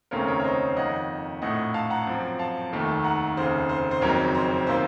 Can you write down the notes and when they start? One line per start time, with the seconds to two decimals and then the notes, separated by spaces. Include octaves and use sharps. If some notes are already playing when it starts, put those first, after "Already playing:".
0.11 F1 D#2 C#3 A3 C4 A#4 C#5
0.28 A#4 C#5
0.40 C#5
0.44 C5 D#5
0.77 F2 D#3 A#3 D#5 F#5
1.42 A#1 A2 A3 D#5 F#5
1.74 F5 A5
1.90 F#5 A#5
2.07 F#2 F3 C4
2.39 F5 A5
2.72 F1 D#2 D#3 A3
3.04 F#5 A#5
3.37 F1 D#2 C#3 C5
3.69 C5
3.91 C5
4.01 F#1 F2 D#3 F#3 C4 A#4 C#5
4.35 C5
4.67 C3 D#3 A#3 C5